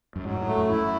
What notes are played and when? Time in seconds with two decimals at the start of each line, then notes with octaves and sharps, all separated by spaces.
0.16 F#2
0.25 G#2 F#3
0.41 A2
0.47 A3
0.58 F#2
0.68 E4
0.74 F#2